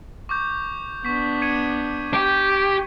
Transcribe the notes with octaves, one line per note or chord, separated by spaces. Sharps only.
C#6 D6 G6
B3 D4 C#6 B6
G#6 C#7 D#7
G4